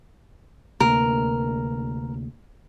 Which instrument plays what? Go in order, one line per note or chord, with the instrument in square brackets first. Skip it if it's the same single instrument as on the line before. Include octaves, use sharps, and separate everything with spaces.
[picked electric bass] D2 C3 A#3 [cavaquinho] A#4